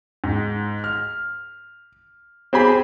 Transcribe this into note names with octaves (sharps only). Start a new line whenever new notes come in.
G#2
F6
C4 G4 G#4 G#5 B5